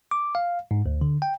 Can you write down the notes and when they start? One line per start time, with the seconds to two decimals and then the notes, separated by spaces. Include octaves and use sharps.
0.11 D6
0.35 F5
0.71 G#2
0.86 D2
1.01 D3
1.22 G5